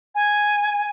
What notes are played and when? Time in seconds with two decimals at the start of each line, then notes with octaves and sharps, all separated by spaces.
0.15 G#5